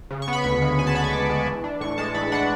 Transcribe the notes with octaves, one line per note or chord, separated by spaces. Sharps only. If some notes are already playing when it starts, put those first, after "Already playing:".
C#3
C#6
B3
B5
D2 C#6
G#3
C#3 G#5
A5
B3 B5
C#6
D2 D6
G#3
E3
D4
A2 C#6
G#3 A5
E3 B5
D4 F#5